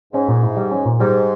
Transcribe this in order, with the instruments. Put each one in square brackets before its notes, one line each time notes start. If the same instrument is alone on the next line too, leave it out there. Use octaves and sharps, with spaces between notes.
[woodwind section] G#2 [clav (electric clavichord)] C#4
[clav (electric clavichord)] A#2
E4
G3
C#4
A#2
[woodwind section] G#2 [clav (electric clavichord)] G3